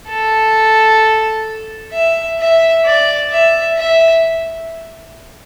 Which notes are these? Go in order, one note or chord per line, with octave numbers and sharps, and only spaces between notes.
A4
E5
E5
D5
E5
E5